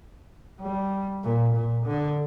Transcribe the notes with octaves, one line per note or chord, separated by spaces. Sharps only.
G3
A#2
A#2
D3